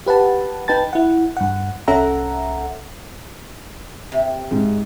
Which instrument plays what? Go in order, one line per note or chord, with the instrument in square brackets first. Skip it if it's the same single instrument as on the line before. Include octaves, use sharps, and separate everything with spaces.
[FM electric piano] G4 B4 F#5 A5
D#4 B4 G5 A5 A6
E4 F#5
G2 F#5
C2 C#4 A4 E5 F#5 A#5
[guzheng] C3
[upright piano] G#2